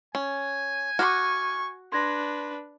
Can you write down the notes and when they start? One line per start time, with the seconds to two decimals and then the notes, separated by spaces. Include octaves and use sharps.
0.15 C#4 G#5
0.99 F#4 C#6 D6 F6
1.92 D4 B4 C6 G#6 A#6